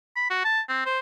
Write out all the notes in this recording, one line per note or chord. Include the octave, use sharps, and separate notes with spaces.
B5
F#4
A5
C4
C5